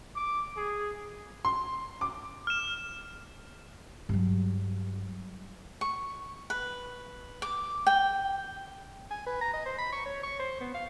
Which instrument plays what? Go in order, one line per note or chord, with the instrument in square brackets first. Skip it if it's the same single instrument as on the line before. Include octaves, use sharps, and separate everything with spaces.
[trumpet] D6
G#4
[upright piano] C6
D6
[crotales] F6 E7
[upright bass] G2 F#3
[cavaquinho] C#6
B4
D6
G5
[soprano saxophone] G#5
B4
A#5
D#5
C5
B5
C#6
C#5
C#6
C5
B3
F5